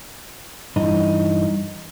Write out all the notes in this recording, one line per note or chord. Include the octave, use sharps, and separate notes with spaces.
G2 E3 D#4